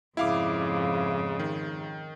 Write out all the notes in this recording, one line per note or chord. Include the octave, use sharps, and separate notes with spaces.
F2 G#2 C#3 E4 F5 D6
D#3